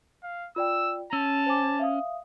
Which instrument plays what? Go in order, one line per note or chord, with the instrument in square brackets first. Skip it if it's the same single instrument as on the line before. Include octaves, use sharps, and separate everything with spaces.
[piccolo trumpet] F5
[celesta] F4 D5 G5 [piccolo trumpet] E6
[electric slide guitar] C#4 [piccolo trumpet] A5 [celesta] E6
[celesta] C5 G#5 D6
E5 F5 D#6